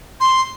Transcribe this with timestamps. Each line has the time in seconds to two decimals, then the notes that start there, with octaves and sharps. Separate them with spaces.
0.20 C6